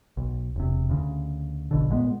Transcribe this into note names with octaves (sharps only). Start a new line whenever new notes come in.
B1
E1 C3
D2 C#3
A#1 B2 D3
A#2 G#3 A#3 B3